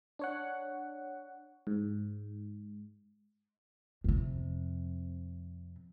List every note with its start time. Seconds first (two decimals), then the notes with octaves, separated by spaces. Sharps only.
0.19 D4 C#5 F#5
1.67 G#2
4.04 F2 C3